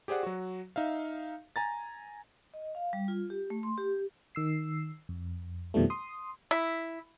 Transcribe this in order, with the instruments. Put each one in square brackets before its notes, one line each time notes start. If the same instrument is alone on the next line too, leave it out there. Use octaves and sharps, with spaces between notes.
[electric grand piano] G4 G#4 C5 D5 F#5
F#3 F#4
D#4 E5 F5
G#5 A#5 A6
[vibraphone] D#5
F5
G3
F4
G4
A3
C6
G4
[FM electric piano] D#3 E6 C7
F2
F2 B2 D#3 F3 G3 A3
C6 D#6
[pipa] E4